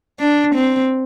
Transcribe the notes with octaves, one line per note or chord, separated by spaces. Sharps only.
D4
C4